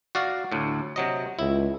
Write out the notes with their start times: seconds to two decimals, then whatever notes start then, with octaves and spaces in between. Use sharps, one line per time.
0.15 F#4 D5 F5
0.52 D2 A2
0.96 C3 F#3 D#5
1.39 C#2 E4